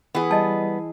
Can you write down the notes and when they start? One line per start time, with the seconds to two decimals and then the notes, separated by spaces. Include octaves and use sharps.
0.15 E3 B3 G#4
0.31 G3 D#5 A5